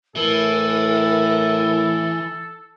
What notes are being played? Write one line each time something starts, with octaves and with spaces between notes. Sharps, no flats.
A2 E3 A4 A#4